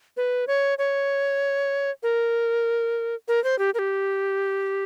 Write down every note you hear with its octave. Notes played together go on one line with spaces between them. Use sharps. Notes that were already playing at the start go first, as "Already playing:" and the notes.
B4
C#5
C#5
A#4
A#4
C5
G4
A#4
G4